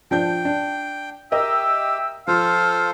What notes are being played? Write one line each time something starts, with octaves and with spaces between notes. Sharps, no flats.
F3 D4 G5 G6
D4
G4 A#4 D#5 E5 G5 E6
F3 F4 A4 C5 F5 F6